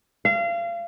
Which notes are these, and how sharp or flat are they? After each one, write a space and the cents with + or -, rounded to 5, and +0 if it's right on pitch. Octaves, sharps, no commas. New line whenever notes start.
F5 -30